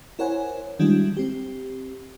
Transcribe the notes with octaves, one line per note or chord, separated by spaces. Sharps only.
E4 A#4 C5 C#5 F#5 G#5
D#3 G3 G#3 D4 E4 F#4
C4 G4